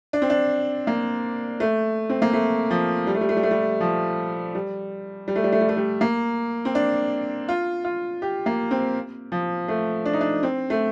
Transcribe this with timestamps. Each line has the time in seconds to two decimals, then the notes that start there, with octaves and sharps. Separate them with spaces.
0.13 D4
0.22 C4
0.30 D4
0.87 A#3
1.60 A3
2.10 C4
2.22 A#3
2.33 A3
2.70 F3
3.07 G3
3.15 A3
3.21 G3
3.29 A3
3.36 G3
3.43 A3
3.51 G3
3.81 F3
4.55 G3
5.28 G3
5.36 A3
5.44 G3
5.52 A3
5.61 G3
5.69 A3
5.77 G3
6.01 A#3
6.65 C4
6.75 D4
7.49 F4
7.85 F4
8.22 G4
8.46 A#3
8.71 C4
9.32 F3
9.68 A3
10.05 D4
10.13 D#4
10.21 D4
10.43 C4
10.70 A3